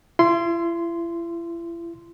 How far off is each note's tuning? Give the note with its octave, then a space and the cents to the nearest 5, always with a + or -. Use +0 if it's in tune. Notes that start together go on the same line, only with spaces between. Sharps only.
E4 +40 C6 -10